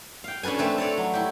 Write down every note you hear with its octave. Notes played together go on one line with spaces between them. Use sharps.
F5 G5
C#4 D4 A4 B4 G#5
A3 C4 B4
A4 C#5 D5
F#3
E4 G4